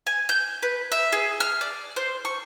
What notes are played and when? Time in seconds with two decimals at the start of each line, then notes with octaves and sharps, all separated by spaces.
0.07 G#5
0.29 G6
0.63 B4
0.92 E5
1.12 G#4
1.40 F6
1.61 D5
1.96 C5
2.25 C#6